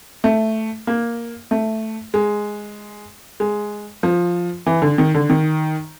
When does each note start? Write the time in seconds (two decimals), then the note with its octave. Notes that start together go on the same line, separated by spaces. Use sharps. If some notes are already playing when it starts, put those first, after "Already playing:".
0.24 A3
0.87 A#3
1.51 A3
2.14 G#3
3.40 G#3
4.03 F3
4.66 E3
4.82 D3
4.98 D#3
5.15 D3
5.30 D#3